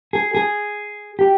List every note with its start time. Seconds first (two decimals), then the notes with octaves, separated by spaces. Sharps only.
0.13 G#4
0.35 G#4
1.19 G4